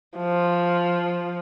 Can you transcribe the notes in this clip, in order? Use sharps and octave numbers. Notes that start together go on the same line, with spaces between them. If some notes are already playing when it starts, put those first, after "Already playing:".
F3